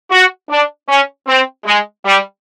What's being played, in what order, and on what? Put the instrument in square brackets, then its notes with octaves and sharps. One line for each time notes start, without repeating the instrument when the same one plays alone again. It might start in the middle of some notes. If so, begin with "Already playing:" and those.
[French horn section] F#4
D4
C#4
C4
G#3
G3